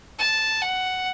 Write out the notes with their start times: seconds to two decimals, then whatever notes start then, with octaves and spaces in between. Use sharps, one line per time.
0.19 A5
0.61 F#5